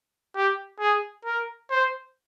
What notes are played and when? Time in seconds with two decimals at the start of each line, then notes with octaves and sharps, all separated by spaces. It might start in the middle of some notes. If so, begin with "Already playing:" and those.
0.36 G4
0.80 G#4
1.25 A#4
1.71 C5